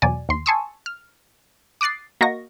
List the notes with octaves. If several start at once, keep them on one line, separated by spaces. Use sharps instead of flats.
E2 B2 F#3 D5 G#5
D#2 C6
G#5 A5 C6 C#6 D#6 E6
F6
D6 D#6 F#6 A6 C7
A#3 F#4 A#4 D#5 C#6 A#6